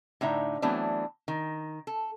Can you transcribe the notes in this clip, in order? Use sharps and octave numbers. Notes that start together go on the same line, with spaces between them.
A2 D3 D#4 E5
E3 F#3 A3 B3 C4 D4
D#3
A4